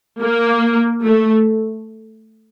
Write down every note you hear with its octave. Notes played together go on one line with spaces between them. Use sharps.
A#3
A3